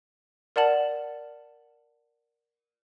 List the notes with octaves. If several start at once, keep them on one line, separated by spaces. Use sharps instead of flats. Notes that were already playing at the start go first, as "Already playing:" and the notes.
A#4 D5 F#5 A5 F#7